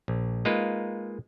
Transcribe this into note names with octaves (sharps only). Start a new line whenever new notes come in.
A#1
G#3 A#3 D#4 F4 B4